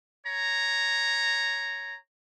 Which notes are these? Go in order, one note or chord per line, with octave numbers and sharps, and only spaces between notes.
C#5 A#5